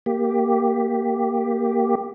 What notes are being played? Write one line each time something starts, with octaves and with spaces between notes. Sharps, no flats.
A#3 G4